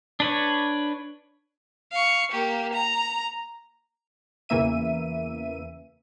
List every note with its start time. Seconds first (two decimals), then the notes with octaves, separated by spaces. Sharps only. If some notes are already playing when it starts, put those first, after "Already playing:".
0.20 D4 B4 C#5
1.92 F5 C#6
2.32 A#3 G4
2.73 A#5
4.49 E2 C#3 E3 A#3 E5 D#7